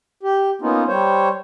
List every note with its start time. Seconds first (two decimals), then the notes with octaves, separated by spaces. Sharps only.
0.23 G4
0.62 A#3 B3 C#4 D#4 F4
0.88 G3 C5 C#5